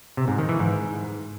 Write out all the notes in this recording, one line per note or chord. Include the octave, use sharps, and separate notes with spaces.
C3
G#2
D#3
E3
G#2